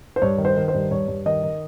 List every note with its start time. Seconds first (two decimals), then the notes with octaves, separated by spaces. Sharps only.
0.16 C5
0.22 G2 C#5
0.38 D#3
0.45 C5
0.56 D#3
0.68 C5
0.74 G2
0.91 G2 C#5
1.08 G2
1.26 D#3 D#5
1.44 D#3